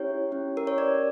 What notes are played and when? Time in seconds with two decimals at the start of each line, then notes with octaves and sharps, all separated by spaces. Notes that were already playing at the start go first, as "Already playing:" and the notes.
Already playing: C#4 E4 G4 C#5
0.31 C#4 E4 G4
0.57 A#4
0.67 C#5
0.78 C#4 G4 D5